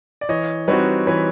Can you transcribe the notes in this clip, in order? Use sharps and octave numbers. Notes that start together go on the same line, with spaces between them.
D5
E3 C#5 D#5
G3 C4 D#4 F#4 B4 C#5
E3 B4 C#5